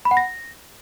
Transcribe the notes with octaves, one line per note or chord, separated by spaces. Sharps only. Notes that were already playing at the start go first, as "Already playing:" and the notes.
B5
F#5
A#6